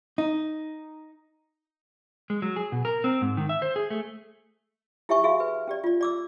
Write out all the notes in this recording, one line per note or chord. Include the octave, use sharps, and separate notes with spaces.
D#4
G#3
F#3
G#4
B2
A#4
C4
G#2
D#3
E5
C5
G#4
A3
E4 G4 C#5 E5 G#5 C#6
F#4 G#4 E5 F5
B4
C#4 G4 D5
F4 D5
D5 D6 E6